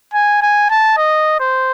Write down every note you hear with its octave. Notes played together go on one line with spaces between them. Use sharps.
G#5
G#5
A5
D#5
C5